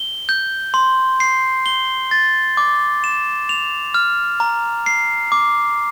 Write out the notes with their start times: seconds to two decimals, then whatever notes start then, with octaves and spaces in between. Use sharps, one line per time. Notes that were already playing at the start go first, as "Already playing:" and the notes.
Already playing: G7
0.29 G6
0.74 C6
1.20 C7
1.66 G7
2.11 A6
2.57 D6
3.04 E7
3.49 F7
3.94 F6
4.40 A#5
4.86 C7
5.32 D6